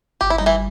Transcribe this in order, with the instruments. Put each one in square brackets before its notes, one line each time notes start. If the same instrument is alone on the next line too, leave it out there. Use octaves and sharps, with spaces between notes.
[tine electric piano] G1 [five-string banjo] G4
[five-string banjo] E4
[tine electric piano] G3 [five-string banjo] D#4
[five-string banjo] E3 E4